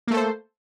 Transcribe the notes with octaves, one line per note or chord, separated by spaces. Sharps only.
A3 A#3 A4 C5